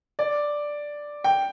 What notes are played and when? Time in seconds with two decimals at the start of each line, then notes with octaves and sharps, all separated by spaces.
0.19 D5
1.24 G5